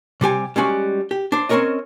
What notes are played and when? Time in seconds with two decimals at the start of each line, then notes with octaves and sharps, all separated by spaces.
0.21 C3 G3 G4 G#5
0.56 G3 G#3 C#4 F#4
1.11 G4
1.32 D4 C5
1.49 C4 C#4 F4 A#4 C#5 D#5